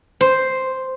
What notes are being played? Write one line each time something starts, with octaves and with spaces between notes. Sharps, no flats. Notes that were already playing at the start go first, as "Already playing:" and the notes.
C5